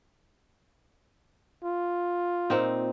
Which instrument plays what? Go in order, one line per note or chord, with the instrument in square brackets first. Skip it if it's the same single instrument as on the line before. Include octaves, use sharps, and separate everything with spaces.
[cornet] F4
[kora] A#2 C4 D#4